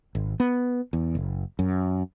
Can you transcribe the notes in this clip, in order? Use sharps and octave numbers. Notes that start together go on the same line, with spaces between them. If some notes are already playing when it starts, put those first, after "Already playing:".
G#1
B3
E2
F#1
F#2